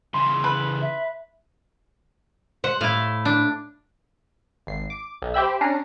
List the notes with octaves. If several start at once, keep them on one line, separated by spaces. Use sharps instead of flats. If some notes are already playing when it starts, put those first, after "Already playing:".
C#3 E3 C6
B4
E5
C5 F#5
A2 E4 F5
D4
G#1 C7
D6
B1
G4 C5 E5 G5 B5 E6
C#4 D4 A#5 C7